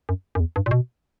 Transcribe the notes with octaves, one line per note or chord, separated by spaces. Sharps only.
F#2
F#2
E2
G2
A#2
B2